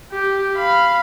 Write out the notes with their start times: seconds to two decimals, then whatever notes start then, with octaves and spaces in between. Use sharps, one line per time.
0.12 G4
0.57 F5 B5